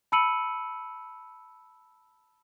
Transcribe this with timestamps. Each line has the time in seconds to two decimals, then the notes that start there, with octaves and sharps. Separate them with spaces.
0.12 A5 B5 E6 C#7 D#7 F#7